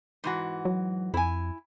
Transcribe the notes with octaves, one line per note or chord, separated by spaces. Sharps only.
G#2 E3 F#4
F#3
F2 E4 G#5